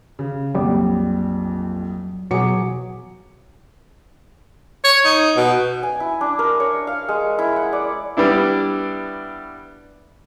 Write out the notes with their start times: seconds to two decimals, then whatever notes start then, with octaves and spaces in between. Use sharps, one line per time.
0.19 C#3
0.55 A#1 F2 F#3 G3 D5
2.31 B2 F#3 G#4 D6 C#7
4.84 C#5
5.05 D#4
5.37 B2
5.83 G#5
6.00 E4
6.21 D4
6.39 A#4
6.60 C#5
6.87 F5
7.08 G#3
7.39 E4
7.56 F#5
7.73 D5
8.17 G3 B3 D4 E4